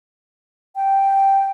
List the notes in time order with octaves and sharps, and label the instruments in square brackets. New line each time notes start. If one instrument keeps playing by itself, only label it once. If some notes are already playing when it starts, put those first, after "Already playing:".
[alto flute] G5